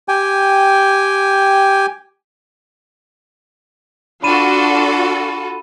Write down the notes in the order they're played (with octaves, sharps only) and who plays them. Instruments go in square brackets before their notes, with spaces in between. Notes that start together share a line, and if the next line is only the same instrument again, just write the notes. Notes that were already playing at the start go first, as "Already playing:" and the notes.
[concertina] G4 G5 G#5
[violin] D4 [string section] F4 F#4 A4 [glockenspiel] B5 D#7 E7